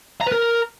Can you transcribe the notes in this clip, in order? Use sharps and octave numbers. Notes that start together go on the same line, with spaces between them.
A#5
B4
A#4